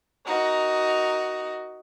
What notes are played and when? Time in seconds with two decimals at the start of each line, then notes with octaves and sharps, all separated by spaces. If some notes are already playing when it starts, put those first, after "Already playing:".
0.24 D#4 F#4 A#4